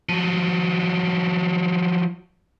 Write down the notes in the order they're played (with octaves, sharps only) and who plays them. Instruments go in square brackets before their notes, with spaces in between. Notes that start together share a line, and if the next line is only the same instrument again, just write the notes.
[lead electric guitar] F3 F#3